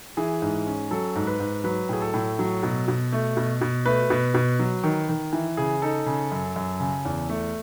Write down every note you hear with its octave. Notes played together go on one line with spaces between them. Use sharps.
E3 G#4
G#2
C#4
F#3 A4
G#2
B4
G#2
F#3 B4
A2 G#4
A4
A2
F#3
B2
B2
A3
B2
B2
A3 B4
B2
B2
F#3
D#3
D#3
E3
C#3 G#4
D#4 A4
C#3
F#2
F#2
C#3
E2
A3